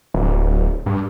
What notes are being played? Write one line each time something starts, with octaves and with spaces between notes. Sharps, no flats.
D1
G2